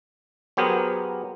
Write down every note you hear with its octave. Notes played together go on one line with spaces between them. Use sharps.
F#3 B3 G4 G#4 A#4 C5